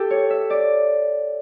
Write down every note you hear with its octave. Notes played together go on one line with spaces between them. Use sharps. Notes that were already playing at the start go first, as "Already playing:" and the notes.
Already playing: G4 A4
C#5
E5
D5